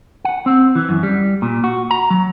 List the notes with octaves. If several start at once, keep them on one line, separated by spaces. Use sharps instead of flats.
F#5
C4
E3
F#2
G3
A#2
F#4
A#5
F#3